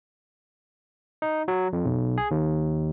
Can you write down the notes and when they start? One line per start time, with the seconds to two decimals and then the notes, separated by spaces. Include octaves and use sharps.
1.22 D#4
1.48 F#3
1.73 F2
1.85 B1
2.18 G#4
2.31 D#2